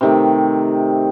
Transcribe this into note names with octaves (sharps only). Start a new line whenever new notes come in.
C3 D#3 A3